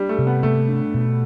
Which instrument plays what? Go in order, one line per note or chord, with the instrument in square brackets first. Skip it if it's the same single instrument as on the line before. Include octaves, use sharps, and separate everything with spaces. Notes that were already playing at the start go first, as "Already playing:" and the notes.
Already playing: [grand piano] G3 [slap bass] D4
[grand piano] A3
[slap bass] C3
[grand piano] B3
[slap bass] C3 [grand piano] A3
[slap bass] D4
B2